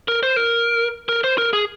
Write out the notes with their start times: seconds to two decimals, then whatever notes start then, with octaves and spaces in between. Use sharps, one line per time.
0.08 A#4
0.23 C5
0.36 A#4
1.09 A#4
1.24 C5
1.38 A#4
1.53 G#4